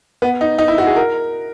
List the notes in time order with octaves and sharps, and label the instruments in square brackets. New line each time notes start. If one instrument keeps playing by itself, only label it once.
[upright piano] B3
D#4
D#4
E4
F#4
G#4
A#4